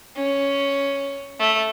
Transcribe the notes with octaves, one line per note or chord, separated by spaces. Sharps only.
C#4
A3